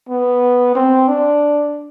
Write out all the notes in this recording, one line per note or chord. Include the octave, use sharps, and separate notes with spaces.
B3
C4
D4